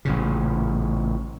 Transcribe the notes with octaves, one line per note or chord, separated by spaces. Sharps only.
A1 A#2 C#3